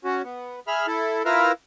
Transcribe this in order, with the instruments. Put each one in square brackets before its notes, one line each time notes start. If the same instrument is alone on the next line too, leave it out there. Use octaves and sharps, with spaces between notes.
[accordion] C#4 F#4
B3
G#4 E5 B5 F6
E4 A4
E4 F4 A#4 B4 E5 F5